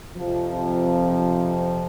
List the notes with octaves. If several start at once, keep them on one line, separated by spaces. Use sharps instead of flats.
F2 C3 F3